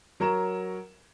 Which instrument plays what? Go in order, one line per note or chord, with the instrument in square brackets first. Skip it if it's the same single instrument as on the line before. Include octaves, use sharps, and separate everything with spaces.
[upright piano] F#3 A#4 C#5 A#5 E7